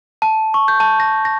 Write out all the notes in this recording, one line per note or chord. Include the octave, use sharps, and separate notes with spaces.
A5
C#6
G6
A5
A#6
A#6